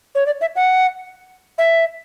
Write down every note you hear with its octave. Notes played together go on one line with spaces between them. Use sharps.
C#5
D5
E5
F#5
E5